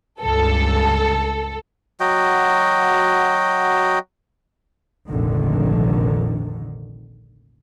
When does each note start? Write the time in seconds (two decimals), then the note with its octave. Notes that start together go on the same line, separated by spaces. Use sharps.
0.20 C#2 G2 A4
2.00 F#3 F#4 D#5 G5
5.08 F1 A#1 G#2 D3 D#3